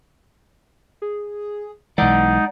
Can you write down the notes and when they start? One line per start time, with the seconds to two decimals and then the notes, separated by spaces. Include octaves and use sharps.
1.02 G#4
1.98 B1 E3 G#3 D#4 D5 F#5